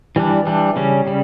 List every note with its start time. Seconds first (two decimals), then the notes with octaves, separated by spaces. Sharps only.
0.16 E3 G3 D4
0.47 E3 G3 D4
0.76 C#3 G3 C#4
1.07 C#3 G3